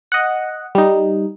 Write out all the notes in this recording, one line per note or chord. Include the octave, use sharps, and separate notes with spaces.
D#5 F#5
G3 D#4